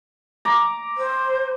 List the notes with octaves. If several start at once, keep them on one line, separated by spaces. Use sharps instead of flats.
A#5 D6
C5